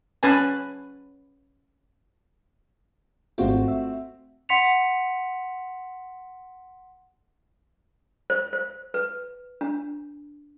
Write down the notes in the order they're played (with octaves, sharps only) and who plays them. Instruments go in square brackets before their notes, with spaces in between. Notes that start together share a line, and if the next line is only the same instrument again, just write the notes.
[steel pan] C#4 B4 G#5 A5
[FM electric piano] G#1 F4 [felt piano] A3 C4 F#4
[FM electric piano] E5
[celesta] F#5 C6 B6 C#7 F7
[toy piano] C5
C5
B4
D4